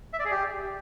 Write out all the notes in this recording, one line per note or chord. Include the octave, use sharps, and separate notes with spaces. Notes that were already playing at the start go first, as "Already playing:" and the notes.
E5
D5
G#4
G4